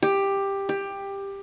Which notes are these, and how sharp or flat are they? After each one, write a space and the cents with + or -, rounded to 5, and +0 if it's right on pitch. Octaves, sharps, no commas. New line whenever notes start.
G4 +10
G4 +15